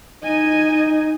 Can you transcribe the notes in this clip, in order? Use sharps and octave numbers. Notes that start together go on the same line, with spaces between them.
D#4 D#5 G#5